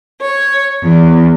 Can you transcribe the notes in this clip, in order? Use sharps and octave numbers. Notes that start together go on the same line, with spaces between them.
C#5
E2